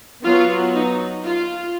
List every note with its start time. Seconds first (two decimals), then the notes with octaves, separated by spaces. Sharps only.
0.24 F#3 B3 F4
0.75 D#4
1.25 F4